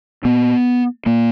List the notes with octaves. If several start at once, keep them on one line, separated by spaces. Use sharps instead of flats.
A#2 B3
A#2 A#3